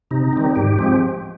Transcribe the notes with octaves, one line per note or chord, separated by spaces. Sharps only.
C3 D#4
D#3 G3 C4
G#2 G4
F3 G#3 C4